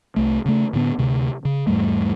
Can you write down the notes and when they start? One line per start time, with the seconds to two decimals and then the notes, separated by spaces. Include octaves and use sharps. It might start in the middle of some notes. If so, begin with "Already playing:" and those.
0.16 C2 A3
0.46 C#3 A3
0.73 A2 D3 B3
0.99 D2 C3
1.45 C#3
1.67 E2 G#2 G3 A3